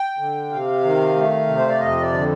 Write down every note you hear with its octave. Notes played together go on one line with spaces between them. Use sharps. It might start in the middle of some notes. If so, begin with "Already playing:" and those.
Already playing: G5
D3
C3 F5
D#3
A3
C3
C5
D5
F2 D#5
D5
D3